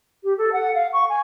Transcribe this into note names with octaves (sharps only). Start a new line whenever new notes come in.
G4
A4
F#5
F5
C#6
G#5